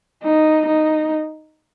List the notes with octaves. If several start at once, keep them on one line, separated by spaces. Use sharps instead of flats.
D#4
D#4